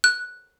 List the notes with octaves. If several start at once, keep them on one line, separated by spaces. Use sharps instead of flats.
F#6